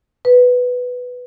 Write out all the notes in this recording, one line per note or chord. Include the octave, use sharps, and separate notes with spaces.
B4